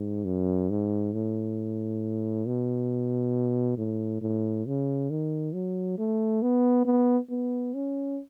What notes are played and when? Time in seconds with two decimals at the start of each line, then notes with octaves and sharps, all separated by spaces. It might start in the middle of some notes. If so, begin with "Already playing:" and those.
Already playing: G#2
0.25 F#2
0.70 G#2
1.14 A2
2.46 B2
3.78 A2
4.22 A2
4.66 C#3
5.10 D#3
5.53 F#3
5.98 A3
6.42 B3
6.85 B3
7.30 B3
7.74 C#4